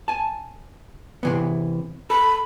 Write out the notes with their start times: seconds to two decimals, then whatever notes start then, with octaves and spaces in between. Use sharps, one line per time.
0.08 G#5 A5
1.23 C3 E3 B3
2.10 A4 B5